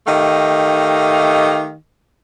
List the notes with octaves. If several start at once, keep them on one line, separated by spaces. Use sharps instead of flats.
D#3 A3 G4 D#5 F5